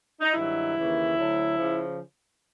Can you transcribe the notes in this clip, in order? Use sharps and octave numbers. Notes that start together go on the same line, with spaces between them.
D#4
G2 D#3 F#3 E4
D#2 C#3 E3
D2 D3 F#3
C#3 F3